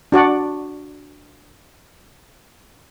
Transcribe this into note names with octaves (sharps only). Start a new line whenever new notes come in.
D4 F#4 D5 F#5